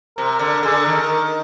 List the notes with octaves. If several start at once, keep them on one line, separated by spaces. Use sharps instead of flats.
C3 A#4
D3
D3 G#4
A4
D#3 A#4
A#4